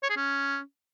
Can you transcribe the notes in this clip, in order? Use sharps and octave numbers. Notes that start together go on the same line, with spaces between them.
C#5
G#4
C#4